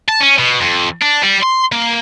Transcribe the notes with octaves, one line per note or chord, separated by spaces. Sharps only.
A5
C#4
B2
F2
D4
G3
C6
A#3